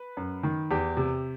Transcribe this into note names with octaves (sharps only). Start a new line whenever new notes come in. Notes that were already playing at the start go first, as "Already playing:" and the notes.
Already playing: B4
F#2
D#3
E2 G4
C3